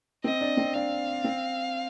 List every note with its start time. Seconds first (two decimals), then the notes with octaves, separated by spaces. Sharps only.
0.24 C4 D#5
0.41 D4
0.57 C4
0.74 D4 F5
1.24 C4